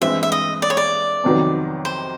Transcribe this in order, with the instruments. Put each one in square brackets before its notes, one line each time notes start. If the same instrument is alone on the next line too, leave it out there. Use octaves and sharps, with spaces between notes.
[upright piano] G2 E3 G#3 C4 [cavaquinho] E5
[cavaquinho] E5
D#5
D5
C#5
D5
[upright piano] F2 C3 D#3 F#3 B3
[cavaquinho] C5